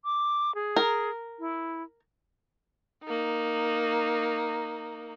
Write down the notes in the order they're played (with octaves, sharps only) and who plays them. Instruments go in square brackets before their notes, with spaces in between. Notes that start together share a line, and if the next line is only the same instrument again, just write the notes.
[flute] D6
G#4
[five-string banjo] A#4
[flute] E4
[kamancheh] A#3 D#4